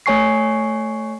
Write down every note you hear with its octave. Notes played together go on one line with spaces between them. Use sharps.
A3 C#5 G#5 C#6 C7